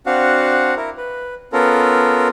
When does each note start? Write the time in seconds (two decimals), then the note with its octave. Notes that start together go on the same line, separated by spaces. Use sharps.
0.06 C4 D4 F#4 F5 F#5
0.77 E4 A#4
0.97 B4
1.53 B3 C#4 F4 A4 A#4